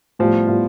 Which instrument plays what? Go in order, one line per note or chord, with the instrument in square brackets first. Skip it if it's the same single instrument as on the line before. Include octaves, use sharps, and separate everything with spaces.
[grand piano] A2 G3 B3 F4 [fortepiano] F3
[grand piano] A2 G3 B3 F4